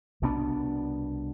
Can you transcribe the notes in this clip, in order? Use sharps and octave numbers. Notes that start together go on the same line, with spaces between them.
C2 B2 B3 D4